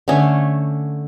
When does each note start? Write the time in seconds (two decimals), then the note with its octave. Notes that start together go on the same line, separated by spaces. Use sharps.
0.08 D3 A3 C#4